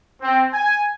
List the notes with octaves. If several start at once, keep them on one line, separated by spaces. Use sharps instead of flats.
C4
G#5